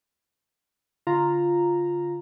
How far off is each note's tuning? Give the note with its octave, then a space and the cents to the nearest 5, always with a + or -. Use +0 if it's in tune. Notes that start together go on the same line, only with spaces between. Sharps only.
D3 -20 F4 +0 A#5 -5